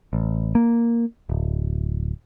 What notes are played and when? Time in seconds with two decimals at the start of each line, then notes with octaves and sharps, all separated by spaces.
0.13 A1
0.55 A#3
1.29 D1